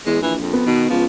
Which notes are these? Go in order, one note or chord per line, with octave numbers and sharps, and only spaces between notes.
E2 G#3
A#1 E3
F2
B3
B2 D#3
C#2 F3